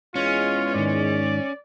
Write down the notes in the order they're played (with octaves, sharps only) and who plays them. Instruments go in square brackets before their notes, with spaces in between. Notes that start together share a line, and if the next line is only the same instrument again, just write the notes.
[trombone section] E2 G#3 [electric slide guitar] C#4 [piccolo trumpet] F4
[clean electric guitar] G#2 D#3 [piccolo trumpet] D5